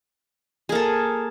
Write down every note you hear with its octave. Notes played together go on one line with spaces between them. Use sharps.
A#3 G#4 A4